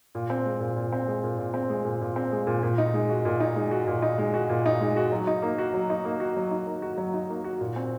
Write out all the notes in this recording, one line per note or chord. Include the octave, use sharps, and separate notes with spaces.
A#2
C4
G#3
A#2
A#2
C4
G#3
A#2
A#2
C4
G#3
A#2
A#2
C4
G#3
A#2
A#2
D#4
G#3
F#4
A#2
D#4
G#3
F#4
A#2
D#4
G#3
F#4
A#2
D#4
G#3
F#4
F#3
D#4
A#3
F#4
F#3
D#4
A#3
F#4
F#3
D#4
A#3
F#4
F#3
D#4
A#3
F#4
A#2
C4